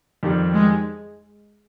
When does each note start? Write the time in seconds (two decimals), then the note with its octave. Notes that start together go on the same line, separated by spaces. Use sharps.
0.23 F2 D#3 G3
0.54 G#3